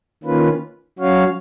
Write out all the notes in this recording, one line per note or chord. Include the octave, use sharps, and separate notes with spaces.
D#3 A#3 C#4 F4 B4
F#3 C#4 F#4 C#5 F5